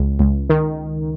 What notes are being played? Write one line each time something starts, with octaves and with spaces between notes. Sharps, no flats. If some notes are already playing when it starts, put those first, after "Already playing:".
Already playing: C#2
C#2
D#3